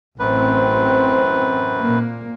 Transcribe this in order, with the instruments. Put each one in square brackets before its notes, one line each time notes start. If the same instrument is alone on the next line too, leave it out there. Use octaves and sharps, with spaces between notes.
[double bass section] A1 C4 [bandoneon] F#2 B4
[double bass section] A#2 A#3